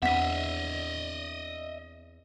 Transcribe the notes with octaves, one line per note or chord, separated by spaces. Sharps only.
E2 C4 D4 D#5 E5 F#5 B6